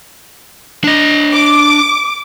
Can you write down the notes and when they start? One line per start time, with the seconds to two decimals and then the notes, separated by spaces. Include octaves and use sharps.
0.84 D4 D#5
1.32 D6